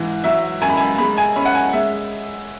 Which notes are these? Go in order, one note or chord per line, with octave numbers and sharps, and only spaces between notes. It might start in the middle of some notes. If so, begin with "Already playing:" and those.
Already playing: G#2 E3
F#3 E5
F#2 G#5
B5
G#5
G#3 B5
G#5
C#4 B5
F#5
G#5
G#3 E5